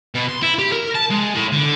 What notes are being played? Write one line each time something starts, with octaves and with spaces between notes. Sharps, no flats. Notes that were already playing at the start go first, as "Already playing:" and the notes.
B2
C6
E4
G4
A#4
A5
G#3
A2
D3